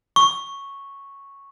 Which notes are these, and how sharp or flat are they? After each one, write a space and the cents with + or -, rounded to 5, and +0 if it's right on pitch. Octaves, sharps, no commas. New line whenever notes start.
C#6 -5